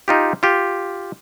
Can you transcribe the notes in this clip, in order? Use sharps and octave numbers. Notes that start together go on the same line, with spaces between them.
D#4 F4 G4
F4 G4